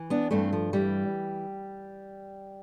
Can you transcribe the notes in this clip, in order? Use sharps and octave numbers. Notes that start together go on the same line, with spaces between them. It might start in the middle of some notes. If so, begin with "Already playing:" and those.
Already playing: E3
B3 D4
G2 A3 C4
F3
E3 G3